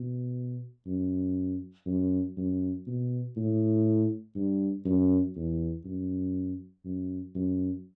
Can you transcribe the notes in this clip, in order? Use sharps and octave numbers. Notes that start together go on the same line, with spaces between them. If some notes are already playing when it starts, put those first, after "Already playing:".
Already playing: B2
F#2
F#2
F#2
B2
A2
G2
F#2
E2
F#2
F#2
F#2